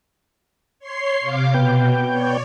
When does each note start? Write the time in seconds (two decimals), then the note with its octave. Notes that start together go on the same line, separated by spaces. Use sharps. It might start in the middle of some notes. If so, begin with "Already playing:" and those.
0.79 C#5 C6 C7
1.21 C3 F5 D6
1.54 B2 B3 G5
2.06 C#5 D5